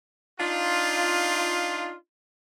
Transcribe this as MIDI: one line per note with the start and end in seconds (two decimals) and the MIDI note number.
0.40 1.94 62
0.40 1.94 63
0.40 1.94 65